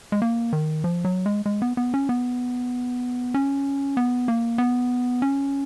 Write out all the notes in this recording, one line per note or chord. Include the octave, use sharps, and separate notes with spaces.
G#3
A#3
D#3
F3
F#3
G#3
G#3
B3
B3
C#4
B3
C#4
B3
A#3
B3
C#4